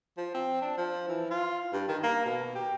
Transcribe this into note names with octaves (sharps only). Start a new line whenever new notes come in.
F3
C4
D4
F3
E3
F4
G2
D#3
A#3
B2
G4